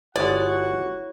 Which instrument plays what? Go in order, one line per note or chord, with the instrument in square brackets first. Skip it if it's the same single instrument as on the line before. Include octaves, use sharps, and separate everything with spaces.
[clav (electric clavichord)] G1 G#3 A5 [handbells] E4 C#5 [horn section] F#4 F#5 [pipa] D5